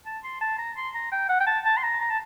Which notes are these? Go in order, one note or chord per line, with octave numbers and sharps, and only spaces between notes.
A5
C6
A5
A#5
C6
A#5
G5
F#5
G5
A5
A5
C6
A#5
A#5
A5